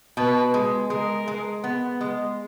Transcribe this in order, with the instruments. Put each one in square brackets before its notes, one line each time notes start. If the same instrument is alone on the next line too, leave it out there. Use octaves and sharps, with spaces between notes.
[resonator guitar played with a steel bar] B2 [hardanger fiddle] B4
[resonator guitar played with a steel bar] G#3
[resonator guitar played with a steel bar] G#3 [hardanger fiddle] A#4
[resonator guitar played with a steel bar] G#3
B3
G#3